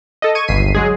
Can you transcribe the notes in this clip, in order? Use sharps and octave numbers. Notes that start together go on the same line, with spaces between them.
A4 D#5
C#6 G#6 D#7
G1 C#2 B6 C7 D#7
F#3 G#3 G#4